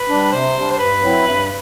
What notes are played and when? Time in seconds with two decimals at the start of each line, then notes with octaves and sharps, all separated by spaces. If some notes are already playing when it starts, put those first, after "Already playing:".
Already playing: B4
0.09 G3 D4
0.32 C3 C5
0.56 G3 D4
0.71 C5
0.78 G2 B4
1.02 F#3 C4 E4
1.25 G2